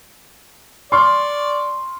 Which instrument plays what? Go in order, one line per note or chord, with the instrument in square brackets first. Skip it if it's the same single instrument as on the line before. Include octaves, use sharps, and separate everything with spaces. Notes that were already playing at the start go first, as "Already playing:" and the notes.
[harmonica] D5 [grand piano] C6 C#6 F6